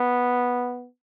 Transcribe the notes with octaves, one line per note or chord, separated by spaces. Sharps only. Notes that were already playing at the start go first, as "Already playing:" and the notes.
Already playing: B3